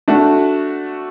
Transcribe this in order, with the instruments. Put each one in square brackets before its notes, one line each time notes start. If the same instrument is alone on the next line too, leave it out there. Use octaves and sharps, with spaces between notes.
[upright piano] A3 D4 F#4